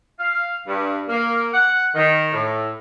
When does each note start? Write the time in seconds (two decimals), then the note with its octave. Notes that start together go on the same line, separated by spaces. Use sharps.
0.20 F5
0.67 G2
1.08 A#3
1.53 F#5
1.95 D#3
2.33 A2